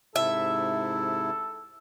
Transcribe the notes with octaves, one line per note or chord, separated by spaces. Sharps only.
G#2 C3 E4 A4 E5